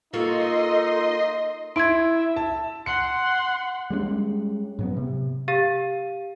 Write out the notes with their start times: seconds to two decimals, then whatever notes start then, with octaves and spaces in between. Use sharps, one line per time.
0.13 A#3 D#4 F4 F#4 A4 D#5 C6
1.76 E4 E5 C6 G#6 D7
2.36 A5
2.86 F#5 C6 C#7
3.90 G3 G#3 B3 C#4
4.79 G#2 F#3 B3
4.97 C3
5.48 G4 F5 A6 D#7